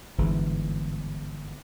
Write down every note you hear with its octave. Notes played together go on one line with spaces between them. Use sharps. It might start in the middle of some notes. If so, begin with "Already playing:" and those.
G1 G#2 E3